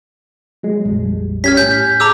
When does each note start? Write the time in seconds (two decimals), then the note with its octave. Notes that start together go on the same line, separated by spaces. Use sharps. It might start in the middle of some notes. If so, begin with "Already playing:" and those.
0.63 F#3 G#3
0.85 A#1 F2 G3
1.44 C#4 G4 F6 G#6 B6
1.57 A2 G#5 G6 B6
2.00 G#4 A5 A#5 D6 E6